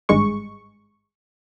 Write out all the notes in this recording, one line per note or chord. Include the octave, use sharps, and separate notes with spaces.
G#1 G2 G#3 C#6